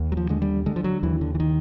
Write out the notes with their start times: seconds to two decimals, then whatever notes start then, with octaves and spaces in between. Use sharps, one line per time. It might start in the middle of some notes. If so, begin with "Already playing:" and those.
Already playing: D#2
0.12 F#3
0.17 F3
0.29 D3 G#3
0.42 G3
0.66 D3 G#3
0.76 F3
0.84 F#3
1.03 D#2 E3
1.21 D3
1.35 E3
1.40 D#3